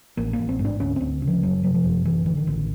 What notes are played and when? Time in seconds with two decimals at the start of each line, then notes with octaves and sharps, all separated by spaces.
0.17 A1 A#3
0.33 A#3
0.39 A1
0.49 C4
0.59 G#2
0.65 D4
0.80 D2 C#4
0.96 D2 C4
1.22 C#3
1.27 F3
1.43 F#1 F#3
1.64 C3 F#3
1.74 F3
1.84 F#1
2.05 A1 E3
2.26 D3 E3
2.37 D#3
2.47 A1